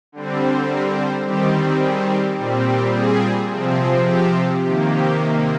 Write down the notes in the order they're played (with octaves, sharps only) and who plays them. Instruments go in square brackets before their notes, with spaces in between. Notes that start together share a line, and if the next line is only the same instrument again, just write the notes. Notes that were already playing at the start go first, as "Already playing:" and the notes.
[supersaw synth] D3 G3 C4
C5
A#4
C5
D#3 G3 C4 G4
G#4
G4
A#2 G3 C4
G4
G#4
C3 F3 C4
G#4
G4
C3 D#3 A#3 G4
G4